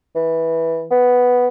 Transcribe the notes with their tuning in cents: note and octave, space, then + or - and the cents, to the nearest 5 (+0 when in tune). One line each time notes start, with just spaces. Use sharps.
E3 -10
B3 +0